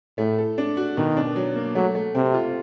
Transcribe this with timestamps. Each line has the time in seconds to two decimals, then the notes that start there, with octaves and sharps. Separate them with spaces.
0.18 A2 A3
0.38 A4
0.58 D4
0.77 F#4
0.97 B2 D#3
1.17 D4
1.36 F#3
1.55 A#3
1.75 F#3 A3
1.95 A3
2.14 C3 C4
2.34 F4